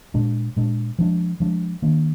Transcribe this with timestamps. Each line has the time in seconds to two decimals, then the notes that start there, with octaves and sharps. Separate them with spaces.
0.14 A#2 G#3 D4
0.56 A#2 G#3 D4
0.99 F3 G#3 D4
1.40 F3 G#3 D4
1.82 D#3 A#3 D4